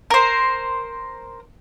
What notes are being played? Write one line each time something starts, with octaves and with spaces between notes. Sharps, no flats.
A#4 C5